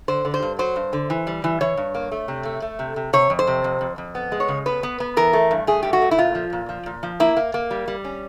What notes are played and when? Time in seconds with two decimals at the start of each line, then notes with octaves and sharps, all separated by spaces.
0.08 D3 C5
0.25 D3
0.34 C5
0.43 G2
0.59 F#3 C5
0.76 G2
0.93 D3
1.10 E3
1.27 G3
1.44 E3
1.61 E3 C#5
1.77 G2
1.95 A#3
2.12 A3
2.28 C3
2.45 A3
2.62 A3
2.79 C3
2.96 C3
3.13 C3 C#5
3.30 F2
3.39 C5
3.47 C3
3.64 F2
3.81 F2
3.98 F2
4.15 B3
4.32 G#3
4.40 C#5
4.48 C#3
4.66 B3 B4
4.83 B3
5.00 B3
5.17 E3 A#4
5.33 A3
5.51 G2
5.67 A3 G#4
5.83 G2 G4
5.93 F#4
6.02 A3
6.11 E4
6.18 A#2 F4
6.35 F3
6.53 A#2
6.69 F3
6.86 A#2
7.03 F3
7.20 A#3 E4
7.37 A#3
7.54 A#3
7.71 G3
7.88 G3
8.05 C#4